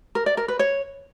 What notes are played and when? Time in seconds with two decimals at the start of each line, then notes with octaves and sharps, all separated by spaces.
0.15 A#4
0.26 D5
0.37 A#4
0.48 B4
0.59 C#5